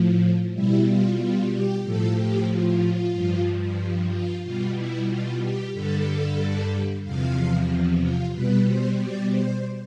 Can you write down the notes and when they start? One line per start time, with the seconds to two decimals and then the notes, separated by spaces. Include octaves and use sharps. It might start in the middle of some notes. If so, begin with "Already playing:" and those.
Already playing: A2 F3
0.54 B2 G3 E4
0.86 F4
1.19 F4
1.51 G4
1.84 A2 F3 A4
2.17 G4
2.49 F4
3.13 G2 F3
4.11 F4
4.43 B2 G3 F4
4.76 E4
5.09 F4
5.42 G4
5.74 G2 D3 G3 A4
7.03 E2 C3 F3 F5
8.02 F4
8.33 B2 G3 B4
8.67 C5
8.99 D5
9.31 C5